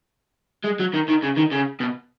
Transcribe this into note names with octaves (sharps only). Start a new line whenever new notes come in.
G#3
F#3
D#3
D#3
C#3
D#3
C#3
B2